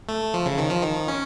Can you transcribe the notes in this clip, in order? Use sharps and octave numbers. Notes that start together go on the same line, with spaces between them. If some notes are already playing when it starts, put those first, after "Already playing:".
A3
F3
C#3
D#3
F3
D#3
C#4